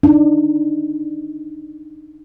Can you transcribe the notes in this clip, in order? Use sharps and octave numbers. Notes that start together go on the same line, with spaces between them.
D4 D#4